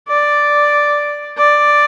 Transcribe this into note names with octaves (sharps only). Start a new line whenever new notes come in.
D5
D5